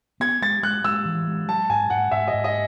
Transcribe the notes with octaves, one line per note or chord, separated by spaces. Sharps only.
B3 G#6
G#3 A6
G#3 F#6
G#3 E6
E3
G#3
F#3 A5
G#2 G#5
G#2 F#5
G#2 E5
D#5
G#2
D#5